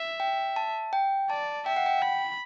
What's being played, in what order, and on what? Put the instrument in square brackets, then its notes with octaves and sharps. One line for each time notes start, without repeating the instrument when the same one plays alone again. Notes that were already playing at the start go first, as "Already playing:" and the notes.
Already playing: [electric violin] E5
[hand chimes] G5
A5
G5
[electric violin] D5 [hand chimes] A5
[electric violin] E5 [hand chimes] G5
[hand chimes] F#5
G5
[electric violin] B5